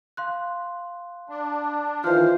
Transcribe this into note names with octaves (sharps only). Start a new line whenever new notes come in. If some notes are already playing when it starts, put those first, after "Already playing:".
F5 C6 F#6
D4
D#3 E3 F4 C5 F5 F6